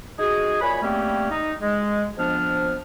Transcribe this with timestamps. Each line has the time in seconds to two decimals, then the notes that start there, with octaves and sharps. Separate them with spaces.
0.19 D#4 F#4 G#4
0.61 A#2 C#5 G#5 B5
0.82 G3 A3 A#3 C4 C#4
1.30 D#4
1.61 G#3
2.18 F2 F3 B3 D4 F6